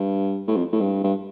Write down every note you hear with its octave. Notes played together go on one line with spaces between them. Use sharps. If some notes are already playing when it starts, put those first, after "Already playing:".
Already playing: G2
A2
F2
A2
G2
G2